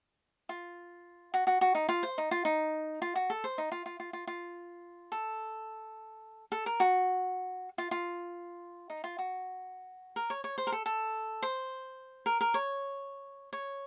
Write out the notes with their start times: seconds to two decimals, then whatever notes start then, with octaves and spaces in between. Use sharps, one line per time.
0.49 F4
1.34 F#4
1.47 F#4
1.61 F#4
1.75 D#4
1.89 F4
2.03 C5
2.18 D#4
2.31 F4
2.45 D#4
3.02 F4
3.15 F#4
3.30 A4
3.44 C5
3.58 D#4
3.72 F4
3.86 F4
4.00 F4
4.13 F4
4.27 F4
5.12 A4
6.52 A4
6.66 A#4
6.80 F#4
7.78 F4
7.91 F4
8.90 D#4
9.04 F4
9.19 F#4
10.16 A#4
10.30 C#5
10.44 C#5
10.58 C5
10.67 A#4
10.72 A4
10.86 A4
11.42 C5
12.26 A#4
12.41 A#4
12.54 C#5
13.53 C#5